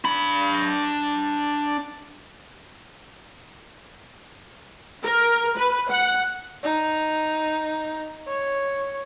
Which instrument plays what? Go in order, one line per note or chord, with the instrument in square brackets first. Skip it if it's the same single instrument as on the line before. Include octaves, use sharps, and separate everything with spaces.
[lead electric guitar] D4 B5
[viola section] A#4
B4
F#5
[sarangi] D#4
C#5